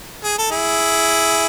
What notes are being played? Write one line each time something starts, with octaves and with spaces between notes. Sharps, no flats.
G#4
A4
E4 G#4